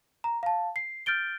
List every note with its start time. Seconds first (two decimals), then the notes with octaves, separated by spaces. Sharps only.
0.24 A#5
0.43 F5 A5
0.76 C7
1.06 F6 G6 A6 D7 G7